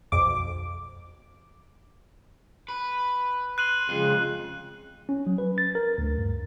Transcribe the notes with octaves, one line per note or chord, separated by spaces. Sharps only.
B1 F2 D6
B4
C6 F#6 D#7 F#7
F2 C#3 F3 G#3
C#4
F#3
B4
A6
A#4
D2
G2